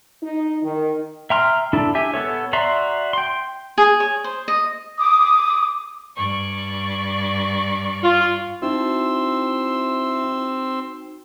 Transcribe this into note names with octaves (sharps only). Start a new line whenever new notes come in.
D#4
D#3
E5 G5 A#5 C6 F6
D4 E4 A4
G4 E5 G#5
B3 A4 C#5
F#4 D5 E5 A#5 C6
G5 C6
G#4
C#5
C5
D#5
D6 D#6
G2 D5 C#6
F4
C4 D#4 E4 F#4 C6 E6